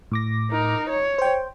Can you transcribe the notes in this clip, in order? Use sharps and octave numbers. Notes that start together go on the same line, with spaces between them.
A2 D6 A#6
D#4 A#4
C#5
C5 G5